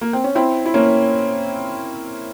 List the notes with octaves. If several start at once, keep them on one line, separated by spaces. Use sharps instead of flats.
A#3
C4
C#4
C4 E4
E4
A#3 C#4